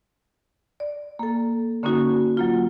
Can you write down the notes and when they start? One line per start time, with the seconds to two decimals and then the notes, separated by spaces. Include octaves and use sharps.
0.80 D5
1.19 A#3 A4
1.83 D3 A#3 C#4 D#4 F#4
2.37 F#3 A#3 F4